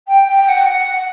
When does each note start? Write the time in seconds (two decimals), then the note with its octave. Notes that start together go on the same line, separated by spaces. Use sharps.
0.07 G5
0.27 G5
0.48 F#5
0.68 F#5